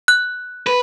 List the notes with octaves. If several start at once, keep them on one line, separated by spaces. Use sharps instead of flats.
F#6
B4